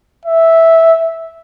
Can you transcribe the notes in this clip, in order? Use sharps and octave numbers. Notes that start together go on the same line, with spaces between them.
E5